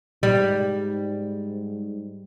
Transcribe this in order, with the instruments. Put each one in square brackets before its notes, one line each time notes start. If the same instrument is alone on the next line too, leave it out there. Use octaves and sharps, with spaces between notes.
[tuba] G#2 [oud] G3